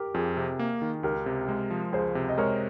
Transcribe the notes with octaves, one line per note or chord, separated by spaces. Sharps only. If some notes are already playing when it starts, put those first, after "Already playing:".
Already playing: G4 A#4
F2 F4 G#4
C3
A#3
D#3
C#2 G4 A#4
C3
G#3
F3
C#2 G#4 C5
C3
D#5
G#3 A#4 C#5